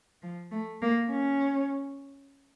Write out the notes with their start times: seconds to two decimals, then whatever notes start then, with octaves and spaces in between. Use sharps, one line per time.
0.22 F3
0.51 A3
0.81 A#3
1.11 C#4